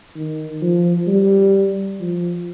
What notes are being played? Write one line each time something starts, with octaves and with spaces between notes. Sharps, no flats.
D#3
F3
G3
F3